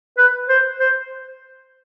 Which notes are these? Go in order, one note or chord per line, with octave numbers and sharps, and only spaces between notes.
B4
C5
C5